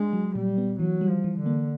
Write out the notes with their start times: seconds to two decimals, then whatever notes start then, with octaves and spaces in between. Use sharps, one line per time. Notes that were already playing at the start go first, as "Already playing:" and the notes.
Already playing: G#3 D4
0.13 F#3
0.35 A#2 G3
0.58 B3
0.79 E3 F#3
1.01 G3
1.09 F3
1.24 E3
1.39 D3
1.46 A#3